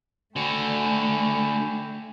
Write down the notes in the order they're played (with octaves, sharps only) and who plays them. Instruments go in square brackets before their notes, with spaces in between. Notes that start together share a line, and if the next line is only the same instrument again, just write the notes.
[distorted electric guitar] D3 F#4 [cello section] A3 [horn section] G5 G#5 B5